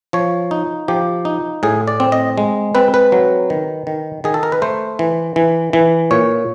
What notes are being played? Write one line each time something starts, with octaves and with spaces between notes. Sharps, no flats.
F3 C#5
D#4
F3 G4
D#4
A2 G#4
D5
C4
D#5
G#3
C4 B4
B4
F#3
D#3
D#3
D#3 G#4
A4
A#4
B4
A3 C5
E3
E3
E3
A#2 C#5